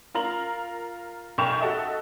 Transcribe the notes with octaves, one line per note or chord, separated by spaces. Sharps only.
F4 A#4 A#5 F#7
B1 A#4 G5 C#6 E7 F7
F#4 A4 D#5 E5